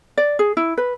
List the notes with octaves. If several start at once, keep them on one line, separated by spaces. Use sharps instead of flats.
D5
G#4
E4
B4